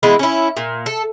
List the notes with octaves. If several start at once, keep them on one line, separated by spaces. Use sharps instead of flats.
E3 G#3 B3 E4
C#4 E4
A#2
A4